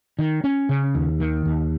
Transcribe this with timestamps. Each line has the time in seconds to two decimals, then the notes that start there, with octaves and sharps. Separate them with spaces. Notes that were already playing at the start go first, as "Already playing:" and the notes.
0.19 D#3
0.44 C#4
0.69 C#3
0.95 D#2
1.20 D#3
1.46 D#2